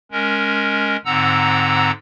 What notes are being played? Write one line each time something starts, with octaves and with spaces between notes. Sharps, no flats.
G#3 C#4 A#4
G#2 D3 C4 F#5 A#5 E6